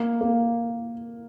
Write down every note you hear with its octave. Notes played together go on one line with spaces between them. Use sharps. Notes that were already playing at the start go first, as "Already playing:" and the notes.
Already playing: A#3
A#3